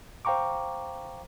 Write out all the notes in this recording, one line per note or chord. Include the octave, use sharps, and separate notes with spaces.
C5 F5 G5 A#5 C#6 D6